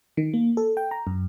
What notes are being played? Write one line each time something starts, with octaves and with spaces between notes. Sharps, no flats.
D#3
A#3
A4
G5
A#5
F#2